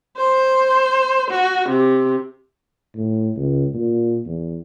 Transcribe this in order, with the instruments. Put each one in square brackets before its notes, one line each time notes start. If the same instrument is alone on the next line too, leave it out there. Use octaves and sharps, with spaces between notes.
[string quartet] C5
F#4
C3
[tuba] A2
C#2
A#2
E2